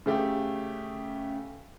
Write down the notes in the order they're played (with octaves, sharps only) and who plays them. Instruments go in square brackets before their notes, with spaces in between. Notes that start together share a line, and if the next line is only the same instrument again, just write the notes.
[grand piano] C#3 A3 G4